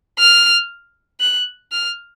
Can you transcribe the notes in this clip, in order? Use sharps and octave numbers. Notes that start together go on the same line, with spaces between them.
F6
F#6
F6